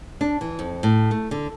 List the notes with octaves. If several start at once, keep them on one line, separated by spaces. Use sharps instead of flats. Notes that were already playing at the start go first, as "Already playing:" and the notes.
D4
E3
F2
A2
A3
D3